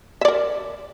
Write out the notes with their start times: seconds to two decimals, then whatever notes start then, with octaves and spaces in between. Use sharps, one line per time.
0.21 E5
0.25 D5
0.28 A#4